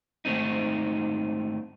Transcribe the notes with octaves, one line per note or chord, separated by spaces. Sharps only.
G#2 D#3 A3 C4 D#4